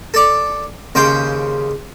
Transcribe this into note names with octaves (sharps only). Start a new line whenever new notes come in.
A4 D5
D#2 C#3 C5 G5